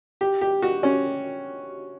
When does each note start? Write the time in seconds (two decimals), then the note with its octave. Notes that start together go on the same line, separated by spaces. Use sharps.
0.21 G4
0.41 G4
0.62 F#4
0.83 C#4